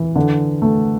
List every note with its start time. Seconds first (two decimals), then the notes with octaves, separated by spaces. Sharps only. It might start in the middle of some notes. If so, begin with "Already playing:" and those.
Already playing: E3
0.16 D3
0.62 A3